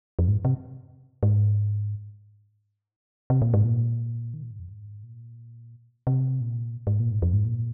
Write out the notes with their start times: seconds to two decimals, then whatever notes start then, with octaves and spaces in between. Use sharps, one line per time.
0.19 F2
0.28 G#2
0.45 C3
1.23 G#2
3.30 C3
3.42 A#2
3.54 G#2
3.64 A#2
4.34 D#3
4.43 A#2
4.51 G#2
4.59 F2
4.69 G#2
5.03 A#2
6.07 C3
6.41 A#2
6.87 G#2
7.00 A#2
7.11 G#2
7.22 F2
7.33 G#2
7.45 A#2